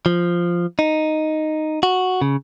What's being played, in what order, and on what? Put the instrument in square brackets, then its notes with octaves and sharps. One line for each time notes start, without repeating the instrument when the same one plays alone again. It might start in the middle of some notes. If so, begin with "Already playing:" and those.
[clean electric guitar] F3
D#4
F#4
C#3